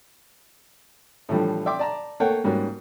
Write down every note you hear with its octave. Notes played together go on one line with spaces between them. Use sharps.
A2 D3 E3 F3 G3
D5 E5 G5 C6 D6
D5 A5 A#5
A3 A#3 A4 C#5 F#5 G5
G#2 C#3 G3 A#3 C#4 F#4